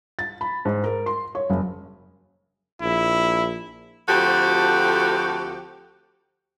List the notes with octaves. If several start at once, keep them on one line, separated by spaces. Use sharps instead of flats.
A6
B5
G#2
A#4
C6
C#5
F#1
A#1 E4
D2 F3 C4 F#4 G4 A4